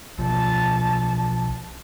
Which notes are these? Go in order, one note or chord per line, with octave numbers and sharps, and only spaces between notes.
B1 F3 A5